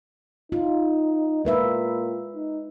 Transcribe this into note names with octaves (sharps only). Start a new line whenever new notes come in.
D#4 F4
A#2 G#3 B4 E5
D#4